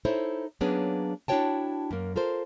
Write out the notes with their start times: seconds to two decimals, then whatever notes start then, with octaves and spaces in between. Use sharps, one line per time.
0.05 D#4 E4 A4 C5 C#5
0.61 F#3 A#3 B3 C#4 D4 G#4
1.28 D4 E4 F#4 C#5 G5 A5
1.91 F#2 A#3
2.16 F4 A4 A#4 C5